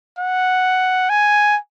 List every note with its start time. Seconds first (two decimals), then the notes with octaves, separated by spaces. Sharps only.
0.18 F#5
1.10 G#5